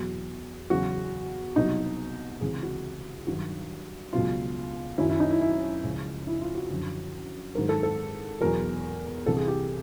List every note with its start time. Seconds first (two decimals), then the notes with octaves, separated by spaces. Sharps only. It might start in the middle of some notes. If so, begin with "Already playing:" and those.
Already playing: E2 B2 F#3 F#4
0.70 E2 C#3 F#3 F#4
1.56 C2 B2 F#3 D#4
2.41 C#2 C3 E3 G#4
2.63 F#4
3.27 G2 D#3 F#3 F#4
4.13 C#2 B2 F#3 F4
4.98 F#2 D#3 F#3 E4
5.09 E4
5.20 D#4
5.31 E4
5.41 E4
5.83 C#2 C#3 F3
6.27 E4
6.41 F4
6.55 F#4
6.70 F#2 D3 F3
7.55 G#2 D#3 F#3 A#4
7.69 A4
7.83 A4
8.41 E2 B2 F#3 A#4
9.26 C2 C3 E3 A4
9.37 G#4
9.48 G4